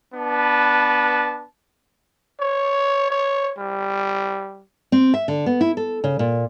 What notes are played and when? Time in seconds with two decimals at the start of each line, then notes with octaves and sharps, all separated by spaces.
0.15 B3 D4 B4 A5
2.40 C#5
3.10 C#5
3.58 G3
4.92 C4
5.14 E5
5.28 D3
5.46 B3
5.61 E4
5.77 A4
6.04 C#3
6.19 A#2